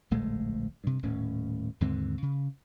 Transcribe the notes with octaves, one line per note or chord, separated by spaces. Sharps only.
D1 A#1 G#3 A3
G2 C3
D#1 A2 C#4
D#2 G#2 D3 C4
C#3